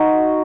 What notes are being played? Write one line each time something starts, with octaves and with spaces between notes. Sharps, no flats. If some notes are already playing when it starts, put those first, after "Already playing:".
Already playing: D#4 F#4